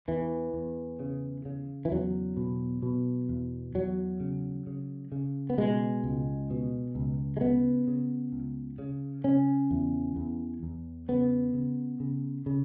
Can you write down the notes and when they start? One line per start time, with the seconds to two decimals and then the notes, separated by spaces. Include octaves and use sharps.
0.08 E2 E3
0.54 E2
1.00 C#3
1.45 C#3
1.85 E3
1.92 E2 F#3
2.37 B2
2.82 B2
3.29 E2
3.75 E2 F#3
4.20 C#3
4.67 C#3
5.12 C#3
5.50 B3
5.58 B2 G#3
6.04 C#2
6.50 B2
6.95 C#2
7.37 G#3
7.41 C#3 B3
7.87 C#3
8.33 C#2
8.79 C#3
9.24 C#3 C#4
9.71 E2
10.16 E2
10.63 E2
11.08 C#3 B3
11.53 C#3
12.00 C#3
12.46 C#3